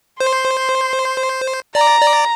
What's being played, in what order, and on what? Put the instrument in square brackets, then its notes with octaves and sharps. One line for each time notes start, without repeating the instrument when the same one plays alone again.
[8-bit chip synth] C5 [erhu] C6
[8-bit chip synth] D5 [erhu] A#5
[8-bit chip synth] D5